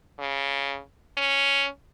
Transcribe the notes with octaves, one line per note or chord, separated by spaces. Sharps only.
C#3
C#4